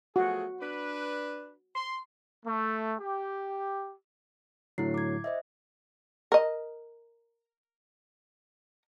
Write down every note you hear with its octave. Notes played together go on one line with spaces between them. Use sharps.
F3 A3 F#4 G#4
D4 B4
C6
A3
G4
A2 D3 F#3 E4 C7
D6 G#6
C5 D#5 E5
A#4 D#5